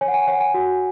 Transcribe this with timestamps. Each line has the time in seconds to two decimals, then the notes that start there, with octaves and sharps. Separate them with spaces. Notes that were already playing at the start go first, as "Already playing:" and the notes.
0.01 C#5 G#5
0.08 F#5
0.14 G#5
0.27 C#5 F#5
0.40 G#5
0.54 F#4